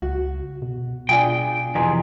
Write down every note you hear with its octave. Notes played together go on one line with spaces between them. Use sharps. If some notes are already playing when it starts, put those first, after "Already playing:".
C#2 F#4
B2
B2 D4 F4 G#4 G5
F2 C3 E3 G#4 G#5